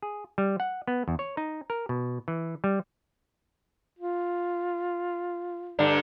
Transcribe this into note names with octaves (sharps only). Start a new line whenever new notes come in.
G#4
G3
F#5
B3
E2
C#5
D#4
A#4
B2
E3
G3
F4
G2 D3 D4